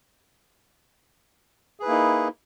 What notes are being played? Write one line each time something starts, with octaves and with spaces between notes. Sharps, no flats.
A#3 D#4 E4 G#4 B4